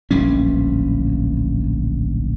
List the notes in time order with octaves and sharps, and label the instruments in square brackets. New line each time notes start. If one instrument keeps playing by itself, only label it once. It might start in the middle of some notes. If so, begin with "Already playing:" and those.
[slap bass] D1 A#1 G3 C#4